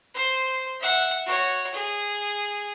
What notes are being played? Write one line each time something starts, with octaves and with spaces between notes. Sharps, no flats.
C5
E5 F#5
F#4 C#5
G#4